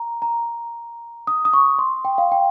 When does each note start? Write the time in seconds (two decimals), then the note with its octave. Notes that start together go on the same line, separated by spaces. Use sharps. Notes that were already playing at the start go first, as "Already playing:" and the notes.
Already playing: A#5
0.22 A#5
1.27 D#6
1.45 D#6
1.54 C#6
1.79 C6
2.05 G5
2.18 F5
2.32 G5